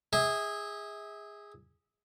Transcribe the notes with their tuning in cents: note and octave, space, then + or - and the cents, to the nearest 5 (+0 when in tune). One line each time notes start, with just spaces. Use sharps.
G#4 -15 E5 -35